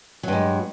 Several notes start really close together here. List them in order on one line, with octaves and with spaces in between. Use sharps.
F#3 G2 G#3